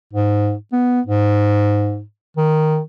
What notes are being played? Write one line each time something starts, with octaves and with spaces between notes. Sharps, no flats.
G#2
B3
G#2
D#3